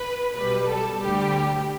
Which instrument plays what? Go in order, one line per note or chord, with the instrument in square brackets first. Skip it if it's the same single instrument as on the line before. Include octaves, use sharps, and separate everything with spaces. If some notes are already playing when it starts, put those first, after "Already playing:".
Already playing: [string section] B4
B1 B2 G3 B4
A4
D2 D3 G3 G4